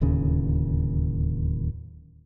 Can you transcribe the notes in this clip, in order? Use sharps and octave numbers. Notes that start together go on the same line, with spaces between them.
D1 D#2 C#3